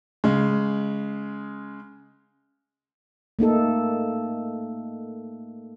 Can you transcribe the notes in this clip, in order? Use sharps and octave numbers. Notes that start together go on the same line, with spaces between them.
C#3 G#3
A3 A#3 D#4 A4